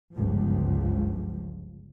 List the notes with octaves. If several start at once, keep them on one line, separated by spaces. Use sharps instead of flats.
G1 C#2 F#2 F3